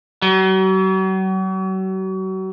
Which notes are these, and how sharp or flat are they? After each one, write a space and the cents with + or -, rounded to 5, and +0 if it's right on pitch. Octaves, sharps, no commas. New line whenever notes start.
F#3 +40